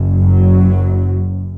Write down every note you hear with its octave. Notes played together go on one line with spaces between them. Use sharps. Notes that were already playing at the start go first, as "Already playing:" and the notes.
Already playing: F#1 F#2
F#3